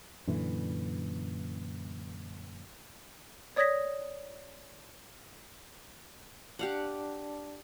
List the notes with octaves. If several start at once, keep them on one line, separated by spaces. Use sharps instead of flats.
F#2 A#2 D3 E3
C#5 D5 D#6 G#6 A#6 B6
D4 G4 D5 F5 F#5 A5